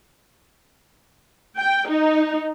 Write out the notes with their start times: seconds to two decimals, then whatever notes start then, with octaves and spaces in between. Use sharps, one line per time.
1.57 G5
1.88 D#4